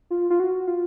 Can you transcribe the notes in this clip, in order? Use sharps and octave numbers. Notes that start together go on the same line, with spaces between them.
F4
F4
F#4
F4